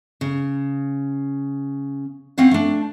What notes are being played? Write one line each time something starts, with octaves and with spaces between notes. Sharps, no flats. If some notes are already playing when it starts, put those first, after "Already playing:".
C#3
C4 C#4 F5 F#5
A3 D4